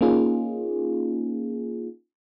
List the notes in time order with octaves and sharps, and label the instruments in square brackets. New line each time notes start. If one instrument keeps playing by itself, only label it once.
[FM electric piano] A#3 C#4 D#4 F4 G#4